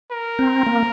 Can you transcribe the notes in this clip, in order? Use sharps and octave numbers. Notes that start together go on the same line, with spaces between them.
A#4
C4
A#3